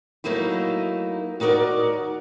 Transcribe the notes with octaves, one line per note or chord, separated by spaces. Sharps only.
F#3 A3 A#3 D#4 E4
D#2 D#4 F#4 A#4 D5